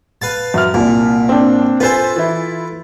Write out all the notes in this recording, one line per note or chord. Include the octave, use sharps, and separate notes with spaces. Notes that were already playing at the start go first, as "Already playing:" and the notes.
B4 F5 A5
F#2 E5 F6
C2 A#2
C4 D4
F4 A4 B4 C5 G#5
E3 E4